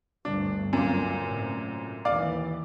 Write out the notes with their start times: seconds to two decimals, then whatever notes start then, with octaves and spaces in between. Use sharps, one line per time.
0.25 G1 D2 D4
0.73 F#2 A#2
1.21 A2 C3
2.05 D#2 E3 D5 F5 D6